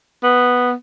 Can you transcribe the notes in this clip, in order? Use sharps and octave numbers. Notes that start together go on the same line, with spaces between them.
B3